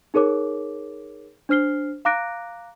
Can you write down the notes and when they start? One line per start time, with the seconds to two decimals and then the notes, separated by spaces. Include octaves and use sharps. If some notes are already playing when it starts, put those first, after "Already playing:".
0.14 D#4 G#4 A#4 C#5 D6
1.49 D4 C5 F6 C7 G7
2.05 F5 A#5 D6 F#6 A#6 D7